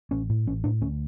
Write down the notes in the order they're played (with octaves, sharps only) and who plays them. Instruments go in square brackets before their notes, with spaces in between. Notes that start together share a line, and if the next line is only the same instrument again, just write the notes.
[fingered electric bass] A1 C#4
A2
A1 C#4
A2 D4
D2 C#4